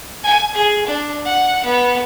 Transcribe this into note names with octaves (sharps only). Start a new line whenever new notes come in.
G#5
G#4
D4
F#5
B3